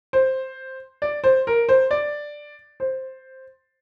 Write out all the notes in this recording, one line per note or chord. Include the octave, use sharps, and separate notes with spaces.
C5
D5
C5
A#4
C5
D5
C5